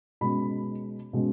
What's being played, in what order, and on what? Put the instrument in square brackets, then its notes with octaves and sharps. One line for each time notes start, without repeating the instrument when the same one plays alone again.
[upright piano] B2 G#3 C#4 B5
B2 G#3 C#4